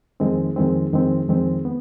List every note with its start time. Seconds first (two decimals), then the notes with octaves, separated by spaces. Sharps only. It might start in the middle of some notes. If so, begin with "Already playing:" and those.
0.20 F2 D#3 G#3 C4
0.56 F2 D#3 G#3 C4
0.93 F2 D#3 G#3 C4
1.28 F2 D#3 G#3 C4
1.65 B3